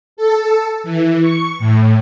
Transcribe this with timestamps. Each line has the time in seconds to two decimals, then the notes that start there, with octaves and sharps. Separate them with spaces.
0.17 A4
0.84 E3
1.22 C#6
1.59 A2